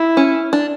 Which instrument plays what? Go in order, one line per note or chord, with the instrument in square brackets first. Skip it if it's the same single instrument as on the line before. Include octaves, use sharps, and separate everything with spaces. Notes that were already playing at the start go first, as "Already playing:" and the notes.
Already playing: [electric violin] E4
[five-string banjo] C#4
D4